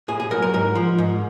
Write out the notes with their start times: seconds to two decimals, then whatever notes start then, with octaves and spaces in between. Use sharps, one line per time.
0.08 A2 G#4
0.20 G#4
0.31 F#3 A#4
0.42 A#4
0.54 G#2 A#4
0.75 F3
0.98 G#2